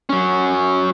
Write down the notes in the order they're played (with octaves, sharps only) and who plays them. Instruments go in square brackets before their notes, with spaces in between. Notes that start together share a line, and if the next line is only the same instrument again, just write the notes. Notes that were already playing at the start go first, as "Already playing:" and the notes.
[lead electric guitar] F#3 C#4